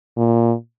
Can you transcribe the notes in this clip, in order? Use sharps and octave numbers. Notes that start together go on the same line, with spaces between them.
A#2